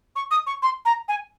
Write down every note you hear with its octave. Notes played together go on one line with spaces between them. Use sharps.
C#6
D#6
C#6
C6
A#5
G#5